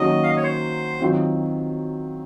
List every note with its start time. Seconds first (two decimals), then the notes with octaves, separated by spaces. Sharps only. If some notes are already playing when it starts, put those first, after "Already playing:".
Already playing: D#3 F#3 A#3 C#4 F#4 D#5
0.23 F5
0.29 D#5
0.37 C#5
0.43 C5
1.00 D#3 F#3 C4 F4